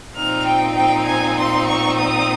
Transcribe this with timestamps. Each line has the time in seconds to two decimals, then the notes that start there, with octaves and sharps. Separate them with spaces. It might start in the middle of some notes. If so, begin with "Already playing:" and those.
0.15 A#2 F3 C4 D#4 F6
0.45 G5
0.75 G5
1.06 G#5
1.37 C6
1.67 C#6
1.97 D#6